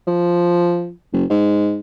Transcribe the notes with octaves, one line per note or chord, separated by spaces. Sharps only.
F3
F#1
G#2